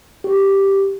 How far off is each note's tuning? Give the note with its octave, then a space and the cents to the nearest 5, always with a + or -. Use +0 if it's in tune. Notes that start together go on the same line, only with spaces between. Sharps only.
G4 +0